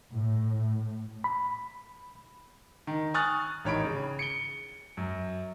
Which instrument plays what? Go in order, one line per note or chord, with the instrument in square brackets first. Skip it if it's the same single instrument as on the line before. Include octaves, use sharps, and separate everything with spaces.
[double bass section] A2
[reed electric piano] B5
[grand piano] D#3
G#5 C#6 D#6 F6 F#6 A6
A1 D#3 C#5 B5 D7
C#3
C#7 D7 G7
F#2